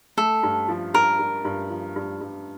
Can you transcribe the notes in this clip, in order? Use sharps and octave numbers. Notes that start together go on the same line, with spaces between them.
A3 A4
G2
F3
G2 A#4
G2
G2
F3
G2
G2